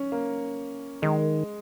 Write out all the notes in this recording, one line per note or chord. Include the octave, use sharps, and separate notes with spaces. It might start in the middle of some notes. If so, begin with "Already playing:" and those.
Already playing: C#4
A#3
D#3 G#3